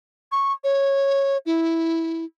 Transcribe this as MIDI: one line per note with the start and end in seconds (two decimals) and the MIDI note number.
0.32 0.53 85
0.64 1.37 73
1.46 2.25 64